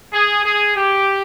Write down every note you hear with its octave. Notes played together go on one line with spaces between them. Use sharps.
G#4
G#4
G4